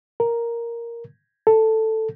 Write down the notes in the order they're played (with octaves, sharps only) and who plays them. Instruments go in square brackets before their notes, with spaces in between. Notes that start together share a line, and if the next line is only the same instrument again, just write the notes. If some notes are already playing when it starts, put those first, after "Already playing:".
[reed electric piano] A#4
A4